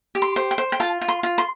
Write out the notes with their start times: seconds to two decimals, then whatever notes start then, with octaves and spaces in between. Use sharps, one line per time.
0.15 G4
0.22 C6
0.36 C5
0.51 G5
0.58 C5
0.72 G5
0.80 F4 A5
1.01 F4
1.08 C6
1.23 F4
1.38 C6